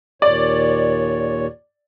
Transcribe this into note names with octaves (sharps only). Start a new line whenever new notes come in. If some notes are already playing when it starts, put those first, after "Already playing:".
D#2 A#2 C#5 D5